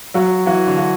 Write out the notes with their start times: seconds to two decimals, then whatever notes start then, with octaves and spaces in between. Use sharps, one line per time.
0.14 F#3 F#4
0.46 E3 F#4
0.67 D3
0.78 F#4